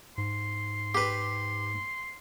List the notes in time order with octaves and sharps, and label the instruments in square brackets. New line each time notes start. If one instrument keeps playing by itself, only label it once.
[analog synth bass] G#2 [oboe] C6
[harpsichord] G4 B4